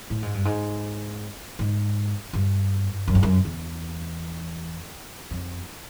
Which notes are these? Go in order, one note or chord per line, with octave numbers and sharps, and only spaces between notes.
A2
G#2
G2
G#2
G#2
G2
F#2
G2
F#2
E2
F2